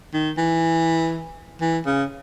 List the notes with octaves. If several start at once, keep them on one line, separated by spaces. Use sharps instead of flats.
D#3
E3
E3
C#3